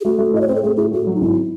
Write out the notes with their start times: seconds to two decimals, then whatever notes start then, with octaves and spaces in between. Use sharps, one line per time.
0.01 G#4
0.04 A3 F#4
0.19 A3
0.34 A2 D#5
0.41 C#5
0.48 C4 C5
0.55 A4
0.62 A3 G#4
0.77 A2 G#4
0.92 A3 F#4
1.07 F#3
1.15 D#4
1.21 G#1 E4